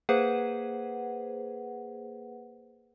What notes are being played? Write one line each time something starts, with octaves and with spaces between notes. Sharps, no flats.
A#3 G#4 B4 C5 F#5